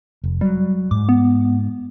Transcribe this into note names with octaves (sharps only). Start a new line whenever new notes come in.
F1
F#3 G3
G#2 D6
B3